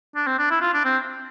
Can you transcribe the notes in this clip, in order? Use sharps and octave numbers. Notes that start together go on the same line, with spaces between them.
D4
C4
D4
E4
F4
D4
C4